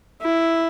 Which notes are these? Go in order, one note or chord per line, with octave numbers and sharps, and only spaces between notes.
E4